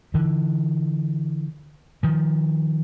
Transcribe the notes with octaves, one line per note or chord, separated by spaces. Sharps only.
D3 E3
D#3 F3